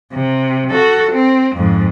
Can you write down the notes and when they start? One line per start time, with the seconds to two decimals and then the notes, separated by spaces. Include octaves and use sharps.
0.13 C3
0.71 F#4 A4
1.12 C4
1.56 F2 G#2